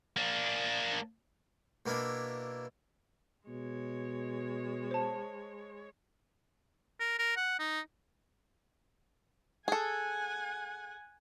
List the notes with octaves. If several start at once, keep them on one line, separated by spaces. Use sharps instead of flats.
A#3 D4
B2 A#3 D4 E4
B2 G#3 C#5
C5 A5
A#4
A#4
F#5
D#4
G#4 A4 F#5 G#5